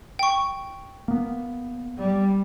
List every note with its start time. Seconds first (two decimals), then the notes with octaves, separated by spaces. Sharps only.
0.19 G5 C#6
1.08 A#3 B3
1.98 G3